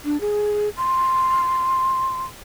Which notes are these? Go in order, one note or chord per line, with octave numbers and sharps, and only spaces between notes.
D4
G#4
C6